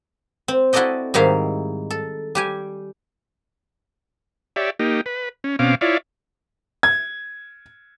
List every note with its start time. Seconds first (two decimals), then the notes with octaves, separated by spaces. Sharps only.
0.48 C4
0.73 E4 F#4 A4 D5 D#5 G5
1.14 G#2 D#3 G3 E4 F5
1.90 A4
2.35 G3 G4 G#5
4.56 G4 C#5 D5 E5
4.79 A#3 D#4 G4
5.06 B4
5.44 C#4
5.59 B2 C4 C#4 F5 D6
5.81 E4 F4 C#5 D5
6.83 G#6